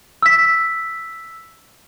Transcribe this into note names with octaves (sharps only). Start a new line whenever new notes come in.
E6 B6